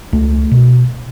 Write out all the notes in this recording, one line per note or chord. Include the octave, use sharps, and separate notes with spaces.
C#2 A3
B2